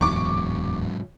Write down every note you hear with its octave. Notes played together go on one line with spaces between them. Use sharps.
D1 E2 G#2 F#3 C#6 D6